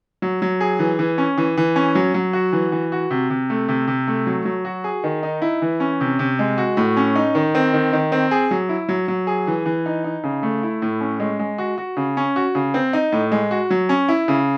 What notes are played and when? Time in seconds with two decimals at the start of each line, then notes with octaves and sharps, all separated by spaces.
0.22 F#3
0.42 F#3
0.61 G#4
0.79 E3
0.99 E3
1.18 C#4
1.38 E3
1.57 E3
1.76 C#4
1.95 F#3
2.14 F#3
2.33 F#4
2.53 E3
2.72 E3
2.92 F#4
3.11 C3
3.30 C3
3.50 A3
3.69 C3
3.87 C3
4.08 A3
4.27 F#3
4.45 F#3
4.65 F#4
4.84 G#4
5.04 D#3
5.23 D#4
5.42 E4
5.62 E3
5.80 C#4
6.01 C3
6.19 C3
6.39 G#3
6.58 F#4
6.77 A2
6.97 C#4
7.16 D#4
7.35 D#3
7.55 C4
7.74 D#3
7.93 D#3
8.12 C4
8.31 G#4
8.51 F#3
8.69 E4
8.89 F#3
9.08 F#3
9.27 G#4
9.47 E3
9.66 E3
9.86 D#4
10.04 D#4
10.24 C#3
10.43 A3
10.63 E4
10.82 A2
11.01 C#4
11.20 G#3
11.39 G#3
11.58 F#4
11.78 F#4
11.97 C#3
12.17 C#4
12.36 F#4
12.55 C#3
12.74 C4
12.93 D#4
13.12 A2
13.32 G#3
13.51 F#4
13.70 F#3
13.89 C#4
14.08 E4
14.28 C#3